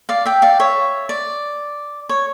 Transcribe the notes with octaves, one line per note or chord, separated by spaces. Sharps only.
D5 F5
E5 G5
D5 F5
C#5 E5
D5
C#5